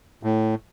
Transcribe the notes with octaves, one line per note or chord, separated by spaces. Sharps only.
A2